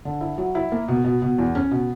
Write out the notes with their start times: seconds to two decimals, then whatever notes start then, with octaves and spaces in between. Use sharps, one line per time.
0.05 D3
0.21 E4
0.38 F#3
0.55 E4
0.72 A#3
0.88 B2
1.04 B2
1.22 B2
1.39 E2
1.55 C#4
1.71 B2